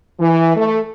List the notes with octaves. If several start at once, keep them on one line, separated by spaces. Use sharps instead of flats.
E3
A3